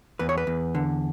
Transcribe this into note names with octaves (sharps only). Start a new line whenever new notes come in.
E2 B4
C#5
B4
E2
D3